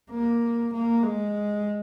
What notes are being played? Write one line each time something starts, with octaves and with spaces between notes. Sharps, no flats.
A#3
A#3
G#3